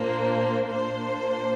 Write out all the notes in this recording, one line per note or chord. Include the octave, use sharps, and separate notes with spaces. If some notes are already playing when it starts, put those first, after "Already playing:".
Already playing: A#2 A#3 D4 C5
A#2 A#3 D4 C5